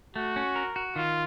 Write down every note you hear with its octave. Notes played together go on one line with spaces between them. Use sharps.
A3 F#4
C#4
A#4
F#4
D#3 F4